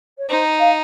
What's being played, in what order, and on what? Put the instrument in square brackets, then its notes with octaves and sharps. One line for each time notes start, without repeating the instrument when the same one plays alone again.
[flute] C#5
[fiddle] D#4 [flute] C5
[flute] F5